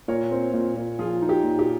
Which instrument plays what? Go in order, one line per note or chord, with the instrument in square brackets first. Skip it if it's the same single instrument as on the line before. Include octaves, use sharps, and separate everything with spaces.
[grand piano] A#2 [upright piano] A#4 C#5
[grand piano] C4
A#2
A#2
[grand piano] F3 [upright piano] F4 G#4
[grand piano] D#4
[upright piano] G4
[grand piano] A#2
[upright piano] G4